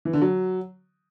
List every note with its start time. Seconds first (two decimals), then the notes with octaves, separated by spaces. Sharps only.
0.05 E3
0.13 D3
0.21 F#3